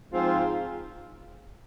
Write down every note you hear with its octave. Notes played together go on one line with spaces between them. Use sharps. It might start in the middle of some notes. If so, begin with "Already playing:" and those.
G#2 F3 C4 F4